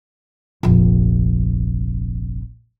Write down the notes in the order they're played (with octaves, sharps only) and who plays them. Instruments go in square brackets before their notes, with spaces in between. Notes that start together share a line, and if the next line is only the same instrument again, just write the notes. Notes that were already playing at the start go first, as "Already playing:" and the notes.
[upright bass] F1 A#1